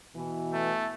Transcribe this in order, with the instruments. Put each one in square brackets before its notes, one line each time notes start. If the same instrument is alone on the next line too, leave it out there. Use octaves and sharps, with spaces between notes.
[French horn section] B2 E3
[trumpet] A3